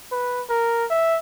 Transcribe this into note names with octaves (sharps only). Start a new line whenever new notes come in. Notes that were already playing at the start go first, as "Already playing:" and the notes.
B4
A#4
E5